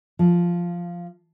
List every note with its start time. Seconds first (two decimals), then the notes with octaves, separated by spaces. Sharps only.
0.19 F3